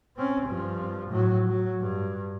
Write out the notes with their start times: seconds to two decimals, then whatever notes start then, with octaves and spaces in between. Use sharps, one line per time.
0.17 C4 C#4
0.45 G2 F3
1.10 A2 F#3
1.47 F#3
1.81 G2